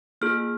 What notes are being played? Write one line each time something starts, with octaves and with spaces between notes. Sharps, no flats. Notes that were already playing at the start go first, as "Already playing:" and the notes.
A#3 F4 G#4 F6